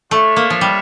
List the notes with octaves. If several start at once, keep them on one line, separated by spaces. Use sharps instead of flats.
A3 D4 F4 C#5 E5
A#3
F3
G3